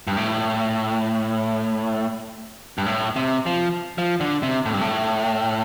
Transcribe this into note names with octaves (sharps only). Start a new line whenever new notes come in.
G2
A2
G2
A2
C3
F3
F3
D3
C3
A2
G2
A2